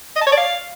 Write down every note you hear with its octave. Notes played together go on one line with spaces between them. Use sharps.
D#5
A5
C#5
D5
F5